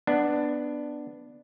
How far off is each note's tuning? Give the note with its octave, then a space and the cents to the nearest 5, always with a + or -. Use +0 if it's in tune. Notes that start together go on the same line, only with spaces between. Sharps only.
B3 +5 D4 +10